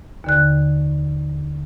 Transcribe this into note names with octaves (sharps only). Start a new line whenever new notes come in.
D#2 D3 F#6